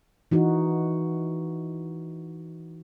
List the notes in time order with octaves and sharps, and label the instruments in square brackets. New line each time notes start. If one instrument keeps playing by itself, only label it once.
[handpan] E3 D#4 F#4